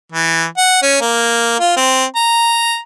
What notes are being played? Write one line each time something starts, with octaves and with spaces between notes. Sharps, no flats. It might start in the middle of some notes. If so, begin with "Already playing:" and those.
E3
F#5
C#4
A#3
F4
C4
A#5